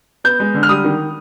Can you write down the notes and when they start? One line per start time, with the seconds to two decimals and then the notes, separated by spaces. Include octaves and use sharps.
0.24 B3 G6
0.40 G#3
0.54 D3
0.63 F6
0.69 G3 D#6
0.84 D#3